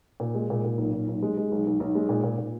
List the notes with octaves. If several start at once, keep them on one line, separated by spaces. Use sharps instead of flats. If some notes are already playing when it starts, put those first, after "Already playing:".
A#2
G#3
A#2
A#2
B1
A#2
B1
G#3
G#3
B1
B1
B1
G#3
A#2
A#2
A#2